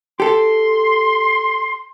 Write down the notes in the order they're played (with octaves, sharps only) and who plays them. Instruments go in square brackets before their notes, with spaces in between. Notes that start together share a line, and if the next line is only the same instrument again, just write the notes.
[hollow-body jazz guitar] G4 A4 [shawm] C6